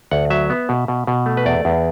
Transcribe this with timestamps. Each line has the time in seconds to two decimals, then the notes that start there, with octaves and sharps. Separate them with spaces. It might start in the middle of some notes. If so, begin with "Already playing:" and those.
0.11 D2 F#5
0.30 F#3 E5
0.50 B3
0.69 B2
0.88 B2
1.07 B2
1.26 A3
1.37 B4
1.46 E2 D5
1.65 E2